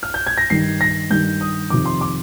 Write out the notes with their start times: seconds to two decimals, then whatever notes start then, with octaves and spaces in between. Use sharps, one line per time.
0.03 F6
0.14 G6
0.27 G#6
0.38 A#6
0.50 G2 D#3 C7
0.81 A#6
1.10 G2 D#3 G6
1.41 D#6
1.70 F2 C3 D#3 D6
1.86 C6
2.01 D6